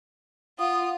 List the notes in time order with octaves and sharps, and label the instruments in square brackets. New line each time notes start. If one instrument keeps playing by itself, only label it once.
[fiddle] F4 [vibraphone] F#5 [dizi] D#6